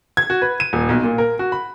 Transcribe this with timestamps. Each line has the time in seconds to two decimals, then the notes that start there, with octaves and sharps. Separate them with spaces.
0.17 G#6
0.30 F#4
0.42 B4
0.60 D#7
0.73 D#1
0.89 B1
1.04 A#2
1.18 A#4
1.39 F#4
1.52 B5